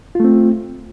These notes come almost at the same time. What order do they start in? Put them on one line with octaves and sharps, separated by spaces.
F4 A3 C4